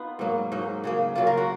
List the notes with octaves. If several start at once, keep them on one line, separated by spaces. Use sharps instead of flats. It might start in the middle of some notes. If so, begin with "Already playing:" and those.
Already playing: B3 D#4 F4
G#2 F#3 A#3
G#2 F#3 A#3 D#4
C#3 F#3 A#3
C#3 F#3 A#3 F4
A#4
F#4